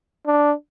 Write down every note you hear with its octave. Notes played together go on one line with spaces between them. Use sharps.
D4